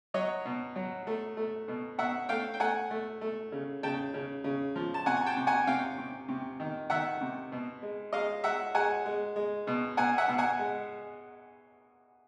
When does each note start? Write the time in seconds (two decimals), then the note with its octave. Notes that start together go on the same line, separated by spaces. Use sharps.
0.14 F#3 C#5 D#5
0.45 B2
0.76 F#3
1.07 A3
1.37 A3
1.68 B2
1.98 B2 E5 F#5
2.29 A3 F5 G5
2.54 G5
2.60 A3 F#5 G#5
2.91 A3
3.21 A3
3.52 C#3
3.83 C#3 G5 A5
4.14 C#3
4.44 C#3
4.76 F3
4.94 A5
5.06 C3 F#5 G#5
5.17 G#5
5.26 G5 A5
5.37 C3
5.47 F#5 G#5
5.67 C3 F5 G5
5.98 C3
6.29 C3
6.60 D#3
6.90 D#3 E5 F#5
7.21 C3
7.52 B2
7.82 G#3
8.13 G#3 D#5 F5
8.44 G#3 E5 F#5
8.74 G#3 F#5 G#5
9.06 G#3
9.36 G#3
9.67 B2
9.97 B2 F#5 G#5
10.18 E5 F#5
10.28 B2
10.38 F#5 G#5
10.59 G#3